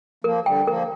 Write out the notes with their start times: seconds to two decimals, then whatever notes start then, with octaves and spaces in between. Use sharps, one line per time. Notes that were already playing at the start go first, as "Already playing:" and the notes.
0.24 F3 A#3 A#4
0.46 D3 G3 G5
0.67 F3 A#3 A#4